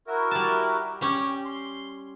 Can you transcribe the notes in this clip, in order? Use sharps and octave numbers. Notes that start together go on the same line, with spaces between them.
E4 F#4 A#4
G3 A5
G3 C#4 G4
C6